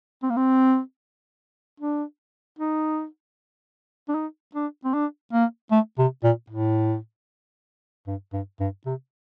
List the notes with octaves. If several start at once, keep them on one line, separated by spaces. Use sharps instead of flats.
C4
A#3
C4
D4
D#4
D4
D#4
D4
C4
D4
A#3
A3
C3
A#2
A2
G2
G2
G2
C3